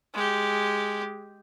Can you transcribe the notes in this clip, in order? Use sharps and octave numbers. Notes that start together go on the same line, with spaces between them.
G#3 G4